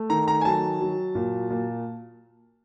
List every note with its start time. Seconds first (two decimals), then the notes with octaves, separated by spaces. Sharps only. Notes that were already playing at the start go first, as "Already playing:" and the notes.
Already playing: A3
0.10 D#3 A#5
0.28 A#5
0.41 G#5
0.45 F#3 A5
0.81 F#3
1.15 A#2
1.50 A#2